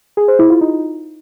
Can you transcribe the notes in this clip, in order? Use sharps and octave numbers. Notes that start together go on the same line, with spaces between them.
G#4
C5
E4
F4
D#4